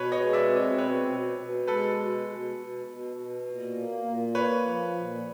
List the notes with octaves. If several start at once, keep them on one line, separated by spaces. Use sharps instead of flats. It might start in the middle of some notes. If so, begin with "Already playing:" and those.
Already playing: B2 B4 C#5
C#5 D#5
G#3
D5 E5
C4
C#5 D#5
B2 B4 C#5
B2
B2
G#3 A4 B4
B2
B2
B2
B2
B2
A#2
A#3
A#2
A#3 B4 C#5
F3
A#2